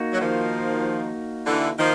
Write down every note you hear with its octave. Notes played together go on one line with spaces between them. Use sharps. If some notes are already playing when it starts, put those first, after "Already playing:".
Already playing: A#3 D#4 F#4
F#3
D#3 F3
D3 E3
D#3 F3